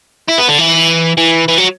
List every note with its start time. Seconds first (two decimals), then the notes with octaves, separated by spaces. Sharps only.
0.28 E4
0.38 B3
0.48 D3
0.58 E3
1.18 E3
1.48 E3
1.58 F#3